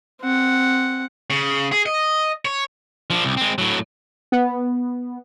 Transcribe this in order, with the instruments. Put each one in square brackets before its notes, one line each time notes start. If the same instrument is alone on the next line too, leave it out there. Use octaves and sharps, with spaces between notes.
[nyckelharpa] C4 F#5
[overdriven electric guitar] C#3
G#4
D#5
C#5
[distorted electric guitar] F3 D4
C2
G#3 C4
A2 F#3
[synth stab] B3